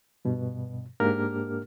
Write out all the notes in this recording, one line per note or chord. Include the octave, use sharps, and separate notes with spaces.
G2 B2
G#2 A#3 D4 G4 A#4 F6